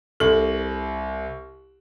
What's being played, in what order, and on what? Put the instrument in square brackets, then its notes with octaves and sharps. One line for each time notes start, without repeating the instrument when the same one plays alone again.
[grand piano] C2 F#7 [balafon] A4